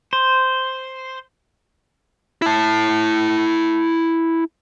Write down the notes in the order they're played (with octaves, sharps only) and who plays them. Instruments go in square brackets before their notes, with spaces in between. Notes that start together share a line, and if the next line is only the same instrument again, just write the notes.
[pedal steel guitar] C5
[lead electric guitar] E4 A5